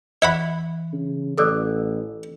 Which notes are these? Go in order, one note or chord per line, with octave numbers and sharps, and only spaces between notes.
E3 E5 F#5 B5
C#3
A1 A4 D5 D6 E6 F#6